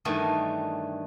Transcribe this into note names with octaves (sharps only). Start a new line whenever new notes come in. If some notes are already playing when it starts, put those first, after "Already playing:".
G2 D#3 E3 G3 A3 D#5